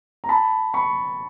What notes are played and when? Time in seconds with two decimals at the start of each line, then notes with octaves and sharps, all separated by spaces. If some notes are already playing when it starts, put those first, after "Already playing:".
0.24 A#5
0.29 A5 B5
0.74 B5 C#6